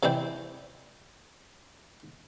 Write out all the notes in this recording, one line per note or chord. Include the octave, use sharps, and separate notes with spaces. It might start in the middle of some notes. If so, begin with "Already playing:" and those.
C3 E3 C4 E4 D5 G5